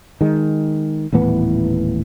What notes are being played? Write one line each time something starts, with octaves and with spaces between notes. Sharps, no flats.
D#3 G#3
D#1 A2 E3 B3